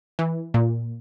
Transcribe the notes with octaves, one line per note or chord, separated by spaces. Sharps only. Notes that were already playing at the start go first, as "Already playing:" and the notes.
E3
A#2